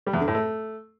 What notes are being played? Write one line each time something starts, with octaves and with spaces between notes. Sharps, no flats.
G3
E2
D3
A2
A3